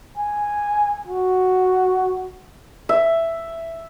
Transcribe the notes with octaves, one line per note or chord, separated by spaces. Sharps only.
G#5
F#4
E5